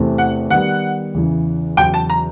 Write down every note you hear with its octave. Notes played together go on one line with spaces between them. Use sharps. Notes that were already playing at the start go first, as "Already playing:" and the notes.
Already playing: E2 C3 E3 A3 C4
F#5
D#3 G3 B3 F#5
E2 C#3 E3
E2 C#3 F#3 G5
A5
A#5